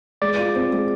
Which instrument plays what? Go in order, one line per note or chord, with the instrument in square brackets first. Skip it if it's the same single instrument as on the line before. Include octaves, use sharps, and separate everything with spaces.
[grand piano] G#3 [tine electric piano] D5
[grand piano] F4
C4
G#3